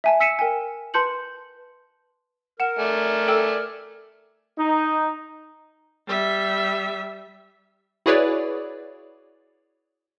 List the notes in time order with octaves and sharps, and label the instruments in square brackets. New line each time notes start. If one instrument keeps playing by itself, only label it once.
[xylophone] E5 G#5 A5
E6 B6 C#7 D#7 E7
A#4 G5 G#5
B4 A5 C6 G6 C#7 F#7
[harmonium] A#4 [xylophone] F#5 E7
[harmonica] A3 D5 G#5
[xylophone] A4 G5 E6
[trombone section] D#4
[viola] G3 E5
[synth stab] E4 F#4 G#4 B4 C#5 D5